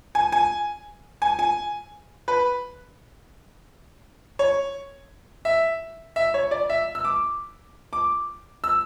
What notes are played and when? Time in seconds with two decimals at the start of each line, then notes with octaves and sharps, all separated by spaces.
0.15 G#5
0.32 G#5
1.22 G#5
1.39 G#5
2.28 B4
4.39 C#5
5.45 E5
6.16 E5
6.34 C#5
6.51 D5
6.70 E5
6.95 E6
7.05 D6
7.93 D6
8.64 E6